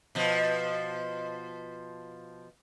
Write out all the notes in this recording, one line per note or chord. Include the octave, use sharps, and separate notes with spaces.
B2 F3